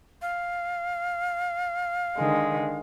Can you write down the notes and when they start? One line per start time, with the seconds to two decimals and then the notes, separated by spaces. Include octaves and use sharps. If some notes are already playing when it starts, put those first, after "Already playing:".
0.22 F5
2.17 D3 D#3 G#3